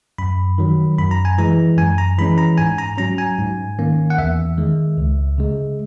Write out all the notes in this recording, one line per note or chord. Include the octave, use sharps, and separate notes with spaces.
F#2 B5
D#3 F#3
F#2 B5
A#5
G#5
E3 G#3 A#5
F#2 G#5
A#5
E3 G#3 C#4 B5
A#5
G#2 G#5
A#5
F#3 C#4 A#5
G#5
G#2
D#3 A#3 C#4
F#5
E2 E5
D#3 G#3
C#2
C#3 G#3